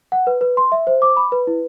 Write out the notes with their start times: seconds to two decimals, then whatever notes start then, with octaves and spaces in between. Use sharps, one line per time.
0.12 F#5
0.27 B4
0.41 B4
0.57 C6
0.72 E5
0.87 C5
1.02 D6
1.17 B5
1.32 B4
1.47 E4